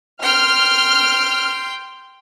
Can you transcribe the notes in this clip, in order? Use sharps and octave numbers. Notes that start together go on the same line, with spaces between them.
G5 C6 F6